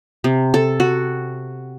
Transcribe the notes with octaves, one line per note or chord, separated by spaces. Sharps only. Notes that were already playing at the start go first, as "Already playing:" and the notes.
C3
A4
F#4